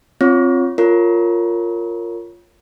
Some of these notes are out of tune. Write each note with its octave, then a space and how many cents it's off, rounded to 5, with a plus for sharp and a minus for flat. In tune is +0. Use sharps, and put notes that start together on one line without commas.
C4 +10 F4 +0 C#5 +0
F4 +0 A#4 -15 C#5 +0